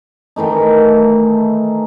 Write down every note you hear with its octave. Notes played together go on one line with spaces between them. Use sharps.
D#3 E3 A3 D#4